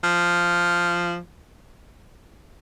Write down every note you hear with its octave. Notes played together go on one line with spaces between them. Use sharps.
F3